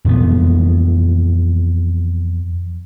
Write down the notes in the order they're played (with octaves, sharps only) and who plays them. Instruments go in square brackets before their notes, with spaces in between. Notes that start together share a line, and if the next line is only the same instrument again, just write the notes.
[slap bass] F2 A#2 E3 B3